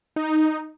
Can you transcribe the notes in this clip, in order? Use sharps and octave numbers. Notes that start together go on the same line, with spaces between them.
D#4